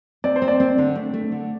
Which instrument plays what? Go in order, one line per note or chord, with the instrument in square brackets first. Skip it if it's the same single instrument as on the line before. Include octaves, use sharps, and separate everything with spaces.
[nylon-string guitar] C4 [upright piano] D5
[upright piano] C5
[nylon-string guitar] C4
[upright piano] D5
[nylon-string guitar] C4
D3
A3
A3
D3